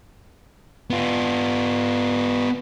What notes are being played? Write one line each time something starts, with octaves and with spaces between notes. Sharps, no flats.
B3 F4